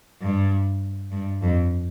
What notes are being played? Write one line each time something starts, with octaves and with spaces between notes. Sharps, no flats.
G2
G2
F2